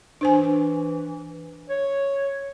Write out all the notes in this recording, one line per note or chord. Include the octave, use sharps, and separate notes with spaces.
E3 D4 C5 G#5
C#5